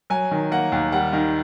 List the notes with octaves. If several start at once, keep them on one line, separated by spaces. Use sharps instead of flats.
F#3 G#5
D#3
A#3 F#5
D#2
G3 F#5
D#3